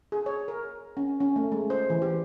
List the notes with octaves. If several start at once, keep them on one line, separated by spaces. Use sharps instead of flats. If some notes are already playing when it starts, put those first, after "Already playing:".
G#4
C#5
A#4
C#4
C#4
A3
G#3
C5
E3
G4